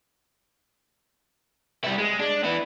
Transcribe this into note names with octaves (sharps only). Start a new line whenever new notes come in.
G3 E4
G#3
D4
B3 E4